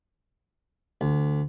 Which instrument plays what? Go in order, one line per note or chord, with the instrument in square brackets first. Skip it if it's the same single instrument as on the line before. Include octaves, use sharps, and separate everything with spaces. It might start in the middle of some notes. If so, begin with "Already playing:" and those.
[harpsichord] D2